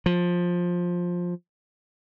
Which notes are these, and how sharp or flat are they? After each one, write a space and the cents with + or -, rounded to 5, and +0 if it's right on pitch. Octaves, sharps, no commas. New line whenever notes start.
F3 +15